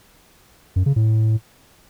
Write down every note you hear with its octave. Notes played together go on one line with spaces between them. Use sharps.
F#2
C#3
A2